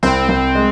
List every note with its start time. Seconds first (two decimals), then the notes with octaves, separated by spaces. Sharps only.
0.03 C2 C4
0.29 C2
0.55 G#3